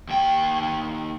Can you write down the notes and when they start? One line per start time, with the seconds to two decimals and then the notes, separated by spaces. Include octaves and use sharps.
0.09 D#2 G5